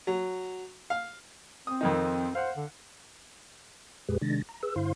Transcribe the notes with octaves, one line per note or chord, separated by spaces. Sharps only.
F#3
F5
C4 D#6
F2 D#3 D#4
C5 F5 F#5
D3
F2 A#2 G#3 G4 G#4 B4
C3 D#3 G#3 D4 A6 A#6
A#5
G#4 B4 E6
G2 D3 E4 C5 F5 C6